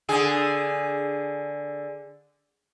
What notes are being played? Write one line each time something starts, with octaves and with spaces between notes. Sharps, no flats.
D3 G#4